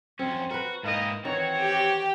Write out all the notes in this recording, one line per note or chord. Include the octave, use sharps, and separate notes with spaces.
F2 C4 C#4
F#4 A#4 B4
G#2 D#3 A#3 E4 D#5
D#3 E3 C4 F#4 C#5
G4 G5